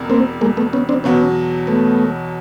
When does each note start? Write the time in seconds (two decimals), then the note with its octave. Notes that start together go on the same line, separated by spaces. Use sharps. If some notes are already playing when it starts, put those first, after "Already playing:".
Already playing: E1 E2 C3
0.10 A#3 C4
0.41 G#3 A#3
0.57 A3 B3
0.73 B3 C#4
0.89 C4 D4
1.04 E2 B2 F#3 B3 C#4
1.67 A3 B3